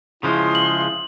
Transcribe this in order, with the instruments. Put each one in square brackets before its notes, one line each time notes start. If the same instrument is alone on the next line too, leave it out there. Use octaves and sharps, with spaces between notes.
[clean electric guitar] C#3 F3 G#3 [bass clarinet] E4 [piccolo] C6
[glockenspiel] F#7